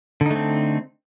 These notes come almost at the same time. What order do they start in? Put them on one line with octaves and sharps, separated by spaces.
D3 D#4 A3 C4